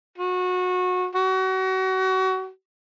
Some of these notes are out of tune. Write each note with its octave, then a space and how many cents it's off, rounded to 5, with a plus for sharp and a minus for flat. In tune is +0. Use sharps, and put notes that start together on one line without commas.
F#4 -25
F#4 +30